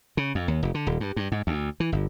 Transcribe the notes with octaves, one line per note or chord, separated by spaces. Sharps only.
C#3
F2
D#2
F1
D3
D#1
G2
G2
G#2
D2
E3
G1